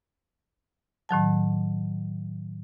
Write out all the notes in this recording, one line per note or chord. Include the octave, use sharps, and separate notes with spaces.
A2 D#3 F#3 A5